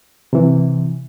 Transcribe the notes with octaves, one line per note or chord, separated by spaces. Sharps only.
C3 E3